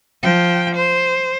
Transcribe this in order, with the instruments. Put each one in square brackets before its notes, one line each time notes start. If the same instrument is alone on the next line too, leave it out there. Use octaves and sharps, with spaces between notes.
[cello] F3 G5
C5